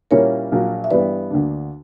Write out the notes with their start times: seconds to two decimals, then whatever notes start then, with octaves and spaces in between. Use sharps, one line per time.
0.11 A#2 G3 A#3 C#4 E4 A#4 C#5
0.51 A#1 A#2 F#3 A#3
0.84 E5
0.90 G2 E3 G3 B3 B4 D5
1.30 D2 D3 A#3 D4